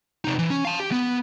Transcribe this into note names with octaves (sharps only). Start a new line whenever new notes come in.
C3 D#4
E3
C#4
F5 A5
G4
B3